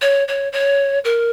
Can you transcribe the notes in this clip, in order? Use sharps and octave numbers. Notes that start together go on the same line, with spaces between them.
C#5
C#5
C#5
A#4